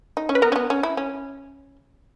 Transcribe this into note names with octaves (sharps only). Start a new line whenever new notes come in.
D#4
C#4
B4
B3 A#4
C#4
B3
C#4
E4
C#4